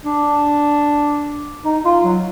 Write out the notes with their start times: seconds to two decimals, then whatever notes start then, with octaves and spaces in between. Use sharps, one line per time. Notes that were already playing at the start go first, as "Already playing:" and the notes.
0.05 D4
1.65 D#4
1.85 F4
2.04 F#3